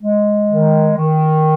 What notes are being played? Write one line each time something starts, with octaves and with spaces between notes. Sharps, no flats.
G#3
D#3
D#3